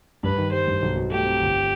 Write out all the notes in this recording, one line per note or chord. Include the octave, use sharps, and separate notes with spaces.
G2 B4
D#3
G3 C5
G2
B1
B2
A3 G4
C4
G1